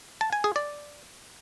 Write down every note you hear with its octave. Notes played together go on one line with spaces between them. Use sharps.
A5
G#5
G#4
D5